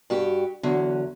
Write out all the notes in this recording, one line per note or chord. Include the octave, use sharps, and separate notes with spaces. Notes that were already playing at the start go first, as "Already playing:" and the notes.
G2 F#4 G4
E2 D3 F#3